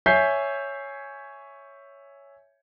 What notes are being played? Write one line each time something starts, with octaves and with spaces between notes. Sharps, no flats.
C#5 E5 G#5 G6 B6 C7